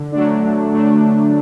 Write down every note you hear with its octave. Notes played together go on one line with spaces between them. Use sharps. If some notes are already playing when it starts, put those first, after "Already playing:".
Already playing: D3
F#3 A3 D4
D3
F#3 A3 D4